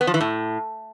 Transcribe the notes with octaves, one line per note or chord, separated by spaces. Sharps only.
B3
F3
E3
A2